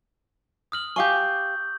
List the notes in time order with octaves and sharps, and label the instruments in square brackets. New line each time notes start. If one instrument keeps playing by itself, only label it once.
[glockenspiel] D#6 F6 F#7
[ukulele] G4 F5 G#5 [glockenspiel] C#6 D6 G6